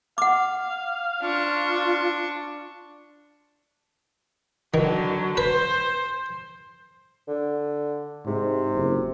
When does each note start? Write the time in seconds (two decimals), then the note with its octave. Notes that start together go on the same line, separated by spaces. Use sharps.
0.18 F5 F#5 D6
1.22 D4 F4 C#6
4.74 D3 D#3 F#3
5.37 B4 C5
7.28 D3
8.26 G#2 C3
8.75 F#1